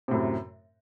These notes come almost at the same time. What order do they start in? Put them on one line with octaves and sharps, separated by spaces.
C3 A2 F#2